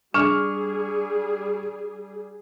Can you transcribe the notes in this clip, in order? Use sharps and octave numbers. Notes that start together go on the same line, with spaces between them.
G3 D4 G#4 C#6 F6